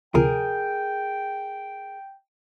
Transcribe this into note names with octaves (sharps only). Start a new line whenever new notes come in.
D2 C3 F3 G#4 A#4 G5